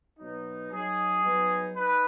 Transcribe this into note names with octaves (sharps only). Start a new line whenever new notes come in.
B2 F#3 B3 D#4
F#3 D#4 G#4
F#3 B3 D#4
D#4 B4